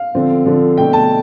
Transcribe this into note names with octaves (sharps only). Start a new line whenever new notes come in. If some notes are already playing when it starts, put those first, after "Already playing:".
Already playing: F5
D3 F3 C4
D3 F3 C4
B2 A3 D4 G5
A5